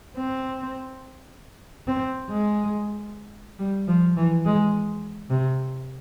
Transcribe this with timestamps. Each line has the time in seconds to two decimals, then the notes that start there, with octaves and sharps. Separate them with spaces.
0.16 C4
1.87 C4
2.30 G#3
3.59 G3
3.87 F3
4.17 E3
4.45 G#3
5.30 C3